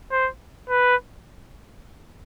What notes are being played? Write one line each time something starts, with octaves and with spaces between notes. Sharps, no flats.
C5
B4